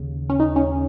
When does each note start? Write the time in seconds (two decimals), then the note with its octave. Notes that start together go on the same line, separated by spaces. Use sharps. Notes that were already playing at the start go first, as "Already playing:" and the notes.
Already playing: D#2 C#3
0.30 C#4
0.40 D#4
0.56 C#4